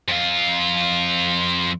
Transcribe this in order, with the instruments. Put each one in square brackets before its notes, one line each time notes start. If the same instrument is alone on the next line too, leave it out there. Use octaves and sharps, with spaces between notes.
[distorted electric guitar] F2 F4